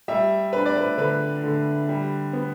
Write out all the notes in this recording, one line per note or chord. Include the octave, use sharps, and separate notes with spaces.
G3 E5
D4 B4
D5
B4
D3 B4
D3
G3
B3